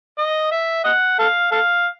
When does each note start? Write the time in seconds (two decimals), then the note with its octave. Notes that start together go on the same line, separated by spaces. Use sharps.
0.18 D#5
0.52 E5
0.84 D#5 F#5
1.19 A4 F5
1.52 A4 F5